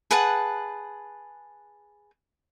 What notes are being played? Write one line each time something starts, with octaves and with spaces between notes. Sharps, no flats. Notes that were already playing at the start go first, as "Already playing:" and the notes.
G#4 B4 F#5 A5